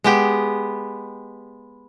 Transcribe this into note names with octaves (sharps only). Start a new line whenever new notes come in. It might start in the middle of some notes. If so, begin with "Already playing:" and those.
G#3 B3 G4